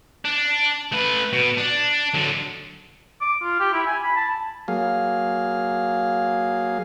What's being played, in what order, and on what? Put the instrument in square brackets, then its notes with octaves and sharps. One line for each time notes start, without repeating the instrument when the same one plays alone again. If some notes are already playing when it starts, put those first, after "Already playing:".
[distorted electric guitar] D4
A3 B4
B2
D4
D3 F#3
[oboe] D6
F4
G4
E4
G#5
B5
A5
[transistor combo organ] F#3 A#3 G#4 F5